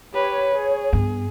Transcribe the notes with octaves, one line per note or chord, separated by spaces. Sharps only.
G4 B4 C#5
G#4
G2 B3